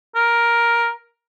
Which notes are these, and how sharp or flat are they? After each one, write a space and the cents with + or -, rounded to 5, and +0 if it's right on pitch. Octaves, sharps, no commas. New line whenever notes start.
A#4 +10